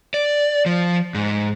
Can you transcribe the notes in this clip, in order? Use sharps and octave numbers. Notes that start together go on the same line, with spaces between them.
D5
F3
G#2